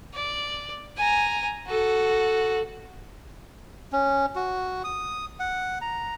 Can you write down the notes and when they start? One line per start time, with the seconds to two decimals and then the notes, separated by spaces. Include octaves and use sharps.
0.13 D5
0.97 G#5 A#5
1.66 F#4 A4
3.92 C#4
4.36 F#4
4.84 D#6
5.39 F#5
5.81 A#5